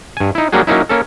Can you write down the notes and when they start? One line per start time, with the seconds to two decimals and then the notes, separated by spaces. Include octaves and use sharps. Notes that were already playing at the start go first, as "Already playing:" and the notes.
0.17 G2 G#5
0.35 D#4 E4
0.52 F#3 G3 A#3 D4 F#4 G#4
0.67 F#3 A#3 C#4 D#4 E4
0.89 A#3 C#4 A4